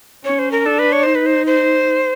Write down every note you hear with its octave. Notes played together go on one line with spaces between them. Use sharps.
C#4 C#5
C5
A#4
D4 A4
B4
C#5
D#4 C5
B4
C5
C5